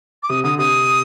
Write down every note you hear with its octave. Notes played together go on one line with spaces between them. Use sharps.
D6
C3 D#6
D3 D#6
C3 D#6